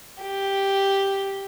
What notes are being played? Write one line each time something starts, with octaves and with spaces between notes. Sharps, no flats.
G4